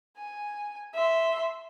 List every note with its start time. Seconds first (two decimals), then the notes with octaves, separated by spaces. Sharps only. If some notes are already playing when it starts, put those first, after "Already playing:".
0.17 G#5
0.94 E5 C6